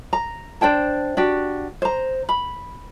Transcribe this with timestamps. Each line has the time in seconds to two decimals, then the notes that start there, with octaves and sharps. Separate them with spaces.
0.13 A#5
0.61 D4 C5 G5 A5
1.17 D4 F#4 G4
1.82 C5 A#5
2.29 B5